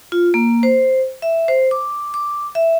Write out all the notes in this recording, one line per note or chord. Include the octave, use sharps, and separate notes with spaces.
F4
A#3
C5
E5
C5
D6
D6
E5